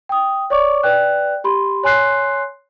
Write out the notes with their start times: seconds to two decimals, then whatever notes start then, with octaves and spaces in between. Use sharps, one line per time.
0.09 G5 D#6
0.50 C#5 D5 C#6 D6
0.83 B4 D5 G5 F#6
1.44 G4 B5 C6
1.84 C#5 G#5 C6 F#6 C7